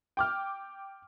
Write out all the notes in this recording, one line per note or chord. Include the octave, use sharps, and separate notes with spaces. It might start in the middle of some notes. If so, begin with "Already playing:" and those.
G5 D6 F6